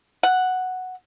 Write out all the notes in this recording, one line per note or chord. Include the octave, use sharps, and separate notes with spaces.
F#5